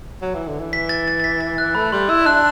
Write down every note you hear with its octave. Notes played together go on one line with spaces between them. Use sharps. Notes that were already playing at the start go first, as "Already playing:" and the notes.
F#3
E3
D3
E3
B6
A6
A6
A6
B6
A6
F#6
A3 B5
G3 C6
E4 E6
D4 F#6